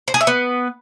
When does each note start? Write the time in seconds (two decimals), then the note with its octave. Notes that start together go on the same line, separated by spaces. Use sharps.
0.08 C5
0.14 G#4
0.21 E5
0.27 B3